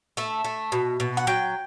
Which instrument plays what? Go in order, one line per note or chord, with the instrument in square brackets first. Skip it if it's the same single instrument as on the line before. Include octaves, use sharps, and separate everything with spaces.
[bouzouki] A3 E5
A3
B2
B2
F#5
F#3 G5